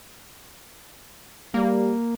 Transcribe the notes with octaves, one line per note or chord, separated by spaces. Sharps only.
G3 A#3